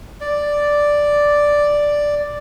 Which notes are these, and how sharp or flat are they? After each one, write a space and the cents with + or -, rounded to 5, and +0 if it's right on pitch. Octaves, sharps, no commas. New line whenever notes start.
D5 +0